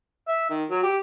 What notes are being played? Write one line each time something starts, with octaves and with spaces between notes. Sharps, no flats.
E5
D#3
F#3
G4